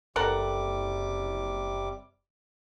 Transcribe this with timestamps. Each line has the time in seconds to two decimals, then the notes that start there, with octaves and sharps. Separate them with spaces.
0.16 F#1 C3 G3 A4 A#4 F#5 D6